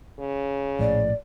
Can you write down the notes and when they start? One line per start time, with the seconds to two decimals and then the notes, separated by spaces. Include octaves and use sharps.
0.19 C#3
0.79 A#1 A2 D5